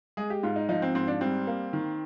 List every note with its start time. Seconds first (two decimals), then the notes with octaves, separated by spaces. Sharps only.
0.17 G#3 G#4
0.30 G4
0.43 G#2 F4
0.56 D#4
0.69 F3 D#4
0.82 C4
0.95 G#2 C4
1.07 D4
1.21 G3 C4
1.47 A#3
1.73 D#3